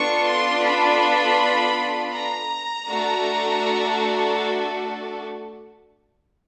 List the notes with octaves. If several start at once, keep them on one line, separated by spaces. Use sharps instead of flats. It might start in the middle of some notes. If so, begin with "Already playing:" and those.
Already playing: B3 D4 F4 A4 C#6
C6
B5
A#5
A3 D4 F#4 A4